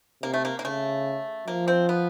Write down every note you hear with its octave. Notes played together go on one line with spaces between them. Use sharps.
C3 A#3
A3
A#3
A#3
C#3 A3
F3 A#3
C4
B3